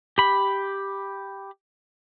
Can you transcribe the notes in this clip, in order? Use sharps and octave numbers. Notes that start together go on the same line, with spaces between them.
G4 B5